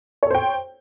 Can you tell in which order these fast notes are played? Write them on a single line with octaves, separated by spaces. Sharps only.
C#5 A4 C5 G5